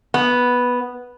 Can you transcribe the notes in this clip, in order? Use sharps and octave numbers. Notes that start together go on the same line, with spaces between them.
B3